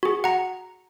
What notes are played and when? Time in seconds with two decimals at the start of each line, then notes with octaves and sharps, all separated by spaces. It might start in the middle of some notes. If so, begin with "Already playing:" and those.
0.03 F#4 G#4
0.24 F#5 A#5